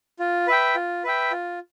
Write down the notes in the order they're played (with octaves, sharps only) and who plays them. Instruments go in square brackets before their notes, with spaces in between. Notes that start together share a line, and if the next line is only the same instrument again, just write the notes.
[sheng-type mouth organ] F4
B4 E5 G5
F4
B4 E5 G5
F4